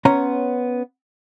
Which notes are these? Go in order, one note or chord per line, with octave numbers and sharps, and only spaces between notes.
B3 C#4 C#5 A#5 C6